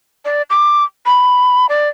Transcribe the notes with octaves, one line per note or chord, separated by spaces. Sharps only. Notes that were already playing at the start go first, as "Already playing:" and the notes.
D5
D6
B5
D5